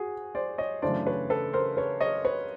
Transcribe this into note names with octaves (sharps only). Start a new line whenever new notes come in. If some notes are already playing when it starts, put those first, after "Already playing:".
Already playing: F#4 G#4
C5 D5
C#5 D#5
F#2 C#3 E3 A3 D4 C5 D5
B4 C#5
A4 B4
A#4 C5
B4 C#5
C#5 D#5
B4 C#5